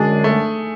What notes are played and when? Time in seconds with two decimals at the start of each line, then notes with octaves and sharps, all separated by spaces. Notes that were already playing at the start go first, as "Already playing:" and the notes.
Already playing: F#2 D3 G#3 D4 G#4
0.24 A3